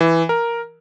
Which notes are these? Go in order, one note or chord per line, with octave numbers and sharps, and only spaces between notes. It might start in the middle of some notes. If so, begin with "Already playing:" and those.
E3
A#4